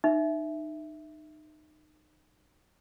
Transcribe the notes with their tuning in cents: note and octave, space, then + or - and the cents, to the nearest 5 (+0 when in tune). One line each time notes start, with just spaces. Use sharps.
D#4 -25 E5 +0